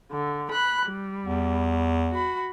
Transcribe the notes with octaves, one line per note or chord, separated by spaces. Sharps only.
D3
B5 F#6
G3
E2
F#4 B5